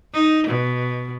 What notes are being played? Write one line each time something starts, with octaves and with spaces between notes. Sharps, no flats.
D#4
B2